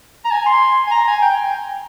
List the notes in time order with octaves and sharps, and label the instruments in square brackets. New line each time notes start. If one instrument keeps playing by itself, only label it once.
[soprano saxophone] A#5
G#5
C6
G#5
A#5
G#5
G5